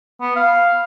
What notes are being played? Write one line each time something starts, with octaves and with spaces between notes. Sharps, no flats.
B3
F5